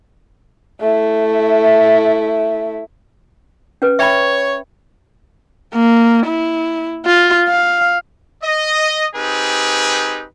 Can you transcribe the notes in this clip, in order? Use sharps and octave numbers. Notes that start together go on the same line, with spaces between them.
A3 E4
C#4 B4
C#5 E5 G5 B5
A#3
E4
F4
F5
D#5
C4 D#4 G4 G#4 B4